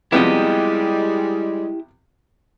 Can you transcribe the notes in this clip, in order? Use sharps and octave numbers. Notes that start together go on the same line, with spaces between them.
C3 F3 G3 G#3 B3 E4 G4 D#5